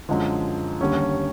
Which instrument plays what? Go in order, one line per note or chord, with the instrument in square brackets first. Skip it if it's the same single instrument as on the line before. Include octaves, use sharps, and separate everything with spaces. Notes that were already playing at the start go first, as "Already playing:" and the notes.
[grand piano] F#2 D3 F3 G#3
D#2 D3 G3 C#4